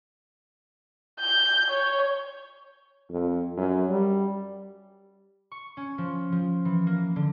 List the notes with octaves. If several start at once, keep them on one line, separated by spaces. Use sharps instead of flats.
G6
C#5
F2
F#2
G3
C#6
C#4
F3
F3
E3
A#3
D3